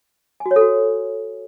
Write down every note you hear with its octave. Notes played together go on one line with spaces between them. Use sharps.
G#5
F#4
C#5
A4
F#4